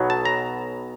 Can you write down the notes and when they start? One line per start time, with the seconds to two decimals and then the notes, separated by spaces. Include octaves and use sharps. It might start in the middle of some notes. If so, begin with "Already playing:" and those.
Already playing: B1 B2 F#3 B3
0.10 A5
0.25 A#5